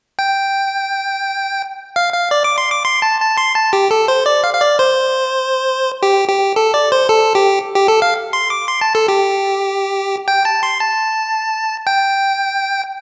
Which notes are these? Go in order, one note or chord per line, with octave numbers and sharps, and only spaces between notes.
G5
F5
F5
D5
D6
C6
D6
C6
A5
A5
C6
A5
G4
A4
C5
D5
F5
F5
D5
C5
G4
G4
A4
D5
C5
A4
G4
G4
A4
F5
C6
D6
C6
A5
A4
G4
G5
A5
C6
A5
G5